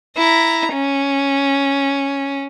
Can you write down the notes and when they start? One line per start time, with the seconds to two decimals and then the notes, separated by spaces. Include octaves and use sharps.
0.17 E4 A#5
0.73 C#4